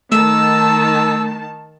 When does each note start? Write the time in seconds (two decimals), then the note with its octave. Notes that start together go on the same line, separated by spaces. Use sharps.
0.12 D#3 A3 A5 E6